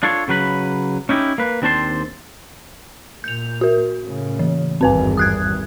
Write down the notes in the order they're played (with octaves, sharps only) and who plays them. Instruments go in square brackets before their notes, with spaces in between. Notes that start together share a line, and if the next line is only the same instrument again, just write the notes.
[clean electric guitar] D4 F4 A4 C#5
C#3 F#3 B4 B5
C#4 D#4 E4 G4
A#3 B4
D#2 C4 D4 C5 A5 C6
[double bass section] A#2 [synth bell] G6 F7
[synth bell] F#4 A#4
[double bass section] A2 C#3
[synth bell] E3
[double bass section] G#1 E2 G2 [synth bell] C4 B4 G#5
[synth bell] D#6 F#6 G#6